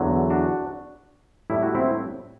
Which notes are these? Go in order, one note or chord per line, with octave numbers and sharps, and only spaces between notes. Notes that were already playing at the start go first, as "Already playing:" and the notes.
Already playing: E2 D3 F#3
D4 F#4
A2 G3 E4
F#4
C4 E4